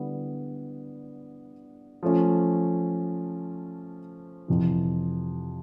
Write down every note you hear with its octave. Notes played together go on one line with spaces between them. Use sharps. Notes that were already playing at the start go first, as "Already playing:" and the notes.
Already playing: D3 G3 B3 E4
F3 A3 C#4
F2 C3 E3